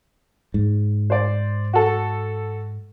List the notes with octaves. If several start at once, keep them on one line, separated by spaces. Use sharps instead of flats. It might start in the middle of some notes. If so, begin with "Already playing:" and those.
G#2
C5 D5
F#4 A4